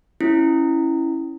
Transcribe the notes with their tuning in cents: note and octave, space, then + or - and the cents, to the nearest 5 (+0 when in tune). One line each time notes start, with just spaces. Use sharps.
C#4 -5 E4 +0